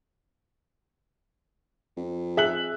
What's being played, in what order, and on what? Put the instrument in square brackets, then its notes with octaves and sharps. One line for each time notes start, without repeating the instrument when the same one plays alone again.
[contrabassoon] F2
[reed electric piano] G#4 [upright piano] E5 F#6 F#7